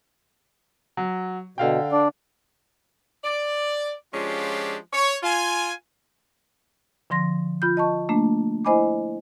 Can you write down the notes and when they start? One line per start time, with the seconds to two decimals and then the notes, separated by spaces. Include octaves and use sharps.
0.97 F#3
1.58 B2 D3 F5 G5
1.92 D4 D5
3.24 D5
4.14 F3 G#3 C#4 D4 F4 G4
4.93 C#5
5.23 F4 G#5
7.10 D3 F3 C6 A#6
7.62 F4 B5 G6
7.77 D#5 A5 C#6
8.09 A3 A#3 D4
8.65 E4 C5 D#5 G#5 B5 D6